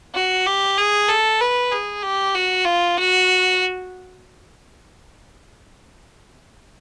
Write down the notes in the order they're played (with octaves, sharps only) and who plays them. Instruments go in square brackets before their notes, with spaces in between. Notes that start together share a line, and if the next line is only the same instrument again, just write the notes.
[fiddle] F#4
G4
G#4
A4
B4
G#4
G4
F#4
F4
F#4